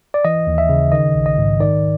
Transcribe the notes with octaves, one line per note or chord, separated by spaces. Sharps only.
D5
E3 D#5
D#2
E5
C#3
D#3 D#5
A#1
D#5
G#2
D#3 D5